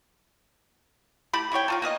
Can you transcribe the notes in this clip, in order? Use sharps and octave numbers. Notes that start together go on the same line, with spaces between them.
A3 E4 G4 B5
C3 E4 C#5 G5
D#4 F4 A4
A#3 B3 G#4 D#5